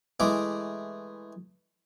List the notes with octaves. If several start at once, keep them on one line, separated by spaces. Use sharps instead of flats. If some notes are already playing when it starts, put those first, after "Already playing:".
E3 G#3 A3 D6